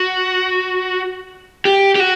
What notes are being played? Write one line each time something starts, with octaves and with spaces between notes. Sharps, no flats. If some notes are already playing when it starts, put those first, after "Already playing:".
Already playing: F#4
G4
G4
F#4